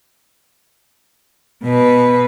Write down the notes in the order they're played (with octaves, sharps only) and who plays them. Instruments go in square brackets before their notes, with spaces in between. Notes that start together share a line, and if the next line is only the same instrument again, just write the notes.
[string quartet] B2 B4